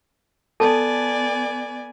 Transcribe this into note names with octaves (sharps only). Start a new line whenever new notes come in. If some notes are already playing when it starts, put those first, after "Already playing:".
B3 A4 D5 G#5 A5